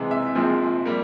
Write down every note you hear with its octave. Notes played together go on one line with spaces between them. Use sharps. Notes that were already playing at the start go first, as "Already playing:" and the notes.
Already playing: C2 C3 E3 G#3
E5
A#1 A#2 F3 G#3 C4
G3 A#3